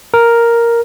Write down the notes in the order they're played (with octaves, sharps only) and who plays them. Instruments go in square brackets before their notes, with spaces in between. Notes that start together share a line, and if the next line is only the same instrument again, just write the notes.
[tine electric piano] A#4